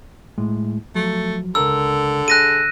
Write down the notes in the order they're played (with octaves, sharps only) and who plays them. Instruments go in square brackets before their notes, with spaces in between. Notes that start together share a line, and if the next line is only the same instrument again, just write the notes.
[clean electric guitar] A2 G#3
[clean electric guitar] F3 F#3 [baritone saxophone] A3
[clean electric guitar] C#2 A#4 A#5 [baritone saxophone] D3 [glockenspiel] E6
[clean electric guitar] G#4 G#5 [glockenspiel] F#6 A#6 D#7